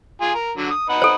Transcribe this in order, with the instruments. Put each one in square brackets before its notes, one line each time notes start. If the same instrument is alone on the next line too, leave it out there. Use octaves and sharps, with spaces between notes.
[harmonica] F4 G#4
A#4
D3 F#3
D#6
D#4 B4 F#5
[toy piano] A4 C5